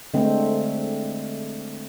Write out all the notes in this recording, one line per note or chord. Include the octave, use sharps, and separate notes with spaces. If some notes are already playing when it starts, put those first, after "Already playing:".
D3 G#3 A3 C4